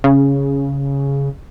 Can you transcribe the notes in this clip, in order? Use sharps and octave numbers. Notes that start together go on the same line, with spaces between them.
C#3